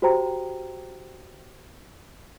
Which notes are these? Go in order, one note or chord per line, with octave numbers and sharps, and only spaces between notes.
F#4 G4 C5 G5 A#5